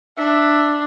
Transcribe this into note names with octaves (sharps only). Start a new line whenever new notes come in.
D4 E5